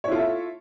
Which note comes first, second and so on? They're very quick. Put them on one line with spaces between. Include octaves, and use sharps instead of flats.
C#5 E4 F4 A4 E5